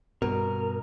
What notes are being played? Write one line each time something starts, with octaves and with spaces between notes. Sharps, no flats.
G2 B2 A#4